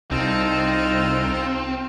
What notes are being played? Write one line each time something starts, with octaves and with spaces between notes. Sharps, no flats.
C2 C4 D#4 F4 A4 F5